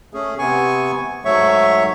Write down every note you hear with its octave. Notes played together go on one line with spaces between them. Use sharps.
A3 C#4 G#4
C3 B3 G#5 C#6
G#2 F#3 A3 C#5 E5 C#6